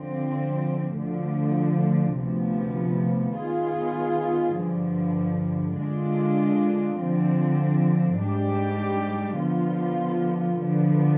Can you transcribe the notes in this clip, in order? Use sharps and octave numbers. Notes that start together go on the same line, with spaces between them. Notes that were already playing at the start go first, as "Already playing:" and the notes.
Already playing: D3 F3 C4
D2 D3 F3
D2 C3 F3 B3
D#3 B3 F4 G#4
G2 D3 F3
D3 G#3 D4 F4
D3 F3 C4
G#2 G3 D4 G4
D3 F3 B3 F4
D3 F3 B3